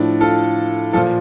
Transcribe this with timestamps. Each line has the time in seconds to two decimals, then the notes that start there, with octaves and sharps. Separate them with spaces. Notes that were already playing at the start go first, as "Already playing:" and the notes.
Already playing: A2 F3 D4
0.21 F4 A4
0.93 A#2 F3 F4 A4